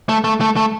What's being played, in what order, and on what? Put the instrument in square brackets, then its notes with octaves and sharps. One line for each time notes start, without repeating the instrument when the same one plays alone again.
[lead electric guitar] A3
A3
A3
A3